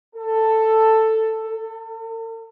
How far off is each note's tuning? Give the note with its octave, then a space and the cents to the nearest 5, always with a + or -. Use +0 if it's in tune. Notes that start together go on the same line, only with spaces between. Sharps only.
A4 +10
A4 +45